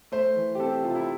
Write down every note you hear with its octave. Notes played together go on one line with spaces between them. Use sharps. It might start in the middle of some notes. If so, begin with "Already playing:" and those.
A3 C5
E3
G4
C4 A4
G4
C3 F4
E4